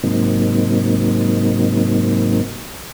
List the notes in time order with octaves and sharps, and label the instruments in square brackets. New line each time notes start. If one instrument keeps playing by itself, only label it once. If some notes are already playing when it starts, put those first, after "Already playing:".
[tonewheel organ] G#2 C3 F#3 A#3 C4 D#4